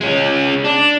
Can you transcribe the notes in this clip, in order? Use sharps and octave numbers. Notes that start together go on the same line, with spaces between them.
G#3 C#4
D4